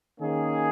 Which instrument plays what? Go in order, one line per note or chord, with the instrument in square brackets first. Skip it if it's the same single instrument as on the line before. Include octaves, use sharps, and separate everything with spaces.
[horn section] D#3 A#3 C#4 G#4